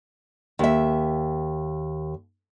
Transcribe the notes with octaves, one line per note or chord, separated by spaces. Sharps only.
D#2 E5